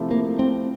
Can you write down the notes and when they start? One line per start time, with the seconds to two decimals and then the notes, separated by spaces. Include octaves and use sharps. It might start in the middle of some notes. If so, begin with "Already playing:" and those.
Already playing: C3 F3 A3 E4
0.11 A#3
0.39 C4